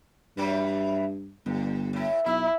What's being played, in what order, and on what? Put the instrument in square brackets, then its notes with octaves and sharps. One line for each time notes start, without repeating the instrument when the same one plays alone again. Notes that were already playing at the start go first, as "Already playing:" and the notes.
[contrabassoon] G2 [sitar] E3 F#3 G3
[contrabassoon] G1 [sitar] G2
[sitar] A2 E4
[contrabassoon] B1 [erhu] E4 [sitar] E5